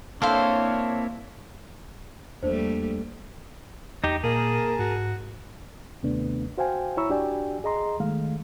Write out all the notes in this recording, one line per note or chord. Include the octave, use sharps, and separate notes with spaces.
A#3 C4 D4 E4 A4 C5 C#5 F5
E2 G3 A3 A#3 D4 C5
E2 D#4 G4
A#2 A#3 G#4 A#4 A5
G#2 F#4
D#2 C3 A3 B3 D4
F#4 C5 F5 G5 G#5
E4 C#5 A#5 B5 C#6 E6
D4 F#4 G4 D5 G5 G#5
G#4 D#5 A#5 C6
D#3 G#3 A3 F5